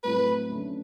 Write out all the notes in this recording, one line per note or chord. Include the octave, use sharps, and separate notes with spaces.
A2 F#3 A3 C4 E4 B4
F#2 D3 A3